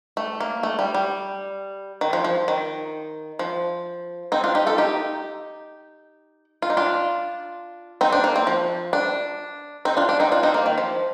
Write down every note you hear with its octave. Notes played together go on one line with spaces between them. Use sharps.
A3
A#3
A3
G3
G3
D#3
F3
F3
D#3
F3
C4 D#4
D4 F4
D#4 G4
F4 A4
D#4 G4
F4
D#4
D4 F4
C4 D#4
D4
A#3
C4
F3
D4
C4 D#4
D4 F4
D4
C4 D#4
D4 F4
C4 D#4
A#3
D#3
F3